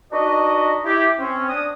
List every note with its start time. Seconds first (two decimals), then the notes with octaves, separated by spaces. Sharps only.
0.12 D4 D#4 F#4 B4 D#5
0.85 E4 G4
1.19 C4 C#4
1.49 D4 D#6